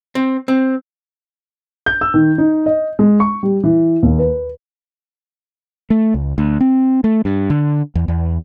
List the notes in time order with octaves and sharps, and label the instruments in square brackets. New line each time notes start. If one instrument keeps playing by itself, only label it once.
[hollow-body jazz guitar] C4
C4
[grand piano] G6
E6
D#3
D#4
D#5
G#3
C#6
G3
E3
D#2
B4
[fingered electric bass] A3
C#2
D2
C4
A3
G2
D3
E2
E2